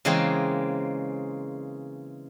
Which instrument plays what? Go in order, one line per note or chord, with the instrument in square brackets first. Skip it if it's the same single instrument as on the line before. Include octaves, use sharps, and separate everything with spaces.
[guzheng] C#3 E3 G#3 A#3 C4